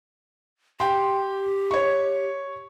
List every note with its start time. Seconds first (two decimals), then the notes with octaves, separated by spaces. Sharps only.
0.80 G4 G5 C6
1.71 C#5 C#6